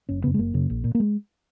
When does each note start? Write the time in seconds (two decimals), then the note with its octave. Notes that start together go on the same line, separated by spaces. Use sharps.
0.09 F#1 C#4
0.24 F#2 C#3 B3
0.34 G#3
0.39 F#1 A#3
0.54 F#2 C#3
0.70 A#1
0.84 A#2
0.95 A#3
1.00 G#3